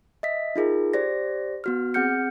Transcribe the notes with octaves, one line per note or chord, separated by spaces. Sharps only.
D#5 E5 B6
D#4 F4 G#4 A#4
G4 C5 D5 A#6
B3 F#4 F6
C4 G#4 F#5 F6 G6 C#7